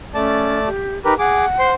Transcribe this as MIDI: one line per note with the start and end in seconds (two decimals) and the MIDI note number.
0.14 0.69 57
0.14 0.59 61
0.14 0.69 74
0.14 0.69 81
0.67 0.99 67
1.05 1.18 63
1.05 1.14 67
1.05 1.14 70
1.05 1.14 71
1.19 1.45 68
1.19 1.70 78
1.19 1.45 86
1.59 1.74 72
1.59 1.74 84